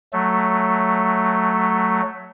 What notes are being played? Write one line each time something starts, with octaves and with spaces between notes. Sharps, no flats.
F#3 A3